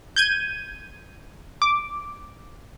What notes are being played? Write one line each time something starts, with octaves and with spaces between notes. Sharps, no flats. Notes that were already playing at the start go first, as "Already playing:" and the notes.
G6 G#6 D#7
D6